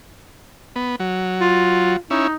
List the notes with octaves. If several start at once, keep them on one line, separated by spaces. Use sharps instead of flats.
B3
F#3
F4
C#4 D#4 E4